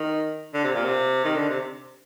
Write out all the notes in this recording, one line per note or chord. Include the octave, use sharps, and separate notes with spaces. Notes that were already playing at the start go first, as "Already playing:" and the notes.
Already playing: D#3
D3
C3
A#2
C3
D#3
D3
C3